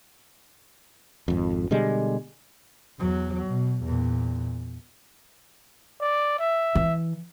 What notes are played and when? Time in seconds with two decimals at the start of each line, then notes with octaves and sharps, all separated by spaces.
1.28 G#1 F2
1.71 B2 D3 G3 G#3
2.99 E2 F#3
3.46 B2
3.83 E2 A#2
6.01 D5
6.39 E5
6.75 E3